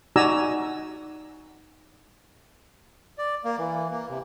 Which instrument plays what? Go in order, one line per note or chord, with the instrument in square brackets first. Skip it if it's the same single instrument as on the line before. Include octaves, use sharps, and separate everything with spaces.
[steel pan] D#4 F#4 D5 G#5 A#5 E6
[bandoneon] D5
A#3
E3
A#3
C3